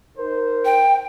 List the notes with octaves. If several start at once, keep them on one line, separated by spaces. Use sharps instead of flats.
D#4 A#4 C5
G5